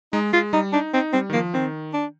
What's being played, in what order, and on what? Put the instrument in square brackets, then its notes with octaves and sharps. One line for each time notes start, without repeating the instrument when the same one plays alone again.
[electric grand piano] G#3 [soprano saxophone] D#4
[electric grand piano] G#3 [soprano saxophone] F4
[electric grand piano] G3 [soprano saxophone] D#4
[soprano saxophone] D4 [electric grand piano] D#4
[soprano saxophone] C4 [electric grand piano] D#4
[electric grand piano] G3 [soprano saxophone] C4
[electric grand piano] D#3
[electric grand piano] F3 [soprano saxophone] A#3
[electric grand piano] D#3 [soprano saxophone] C4
[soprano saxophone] D4